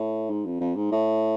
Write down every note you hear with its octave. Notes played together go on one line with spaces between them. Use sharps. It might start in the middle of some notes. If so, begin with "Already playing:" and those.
Already playing: A2
G#2
F2
F2
G#2
A2